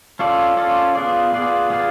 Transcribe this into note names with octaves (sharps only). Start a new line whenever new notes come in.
C#4 F4 A4 D5
C#4 F4 A4 D5
B3 F4 G#4 D5
B3 F4 G#4 D5
B3 F4 G#4 D5